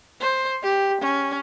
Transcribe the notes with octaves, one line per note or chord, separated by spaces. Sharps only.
C5
G4
C#4